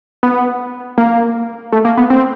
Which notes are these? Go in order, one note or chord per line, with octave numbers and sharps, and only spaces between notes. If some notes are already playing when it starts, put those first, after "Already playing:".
B3
A#3
A3
A#3
B3
C4